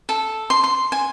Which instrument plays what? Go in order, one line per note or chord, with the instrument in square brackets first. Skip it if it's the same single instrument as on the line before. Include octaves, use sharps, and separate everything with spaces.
[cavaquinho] A4
C6
C6
G#5